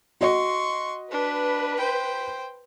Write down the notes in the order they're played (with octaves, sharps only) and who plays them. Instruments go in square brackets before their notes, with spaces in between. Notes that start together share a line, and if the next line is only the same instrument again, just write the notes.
[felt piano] F#4 D#5 [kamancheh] C6 C#6
[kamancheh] D4 [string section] B4
[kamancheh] C5 G5